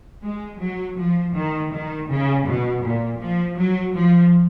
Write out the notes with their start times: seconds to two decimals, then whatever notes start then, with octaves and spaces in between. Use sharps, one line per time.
0.23 G#3
0.60 F#3
0.97 F3
1.34 D#3
1.72 D#3
2.08 C#3
2.46 B2
2.82 A#2
3.20 F3
3.57 F#3
3.94 F3